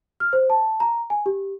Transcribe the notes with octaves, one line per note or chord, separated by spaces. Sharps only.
F6
C5
A5
A#5
G#5
G4